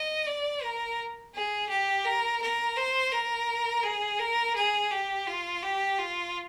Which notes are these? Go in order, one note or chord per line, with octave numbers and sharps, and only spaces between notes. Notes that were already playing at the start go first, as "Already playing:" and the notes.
Already playing: D#5
D5
A#4
G#4
G4
A#4
A#4
C5
A#4
G#4
A#4
G#4
G4
F4
G4
F4